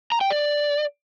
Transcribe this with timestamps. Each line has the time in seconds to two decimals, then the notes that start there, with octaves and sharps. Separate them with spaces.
0.12 A#5
0.21 G5
0.30 D5